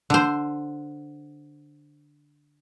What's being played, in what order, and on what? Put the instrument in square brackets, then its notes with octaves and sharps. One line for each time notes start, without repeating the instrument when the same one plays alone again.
[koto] D3 C5